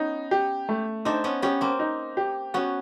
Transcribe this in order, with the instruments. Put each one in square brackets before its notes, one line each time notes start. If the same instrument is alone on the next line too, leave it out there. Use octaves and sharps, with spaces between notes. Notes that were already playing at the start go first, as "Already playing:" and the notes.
Already playing: [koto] B3 C#4 [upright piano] D#4
[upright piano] G4
A3
[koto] C4 D4 [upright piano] D#4
[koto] B3 C#4
[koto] B3 C#4 [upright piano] G4
[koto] A#3 C4
[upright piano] D#4
G4
[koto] B3 C#4 [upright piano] F#4